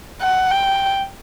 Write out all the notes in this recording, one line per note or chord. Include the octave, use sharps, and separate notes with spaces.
F#5
G5